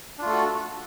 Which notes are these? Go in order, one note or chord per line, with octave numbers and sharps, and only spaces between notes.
A3 D4 F4 F#4 A4